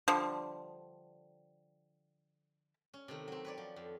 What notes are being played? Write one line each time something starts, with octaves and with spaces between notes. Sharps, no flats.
D3 F3 G3
C#4
C3 D#3 A3
F#3 C4
B4 C#5 D5
F3
F2